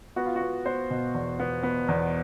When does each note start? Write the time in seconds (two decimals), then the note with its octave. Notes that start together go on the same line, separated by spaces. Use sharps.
0.16 B3 F#4
0.26 F4
0.36 F#4
0.41 B3
0.66 B3 C5
0.90 B2
1.14 E2
1.40 B3
1.63 B3
1.88 E2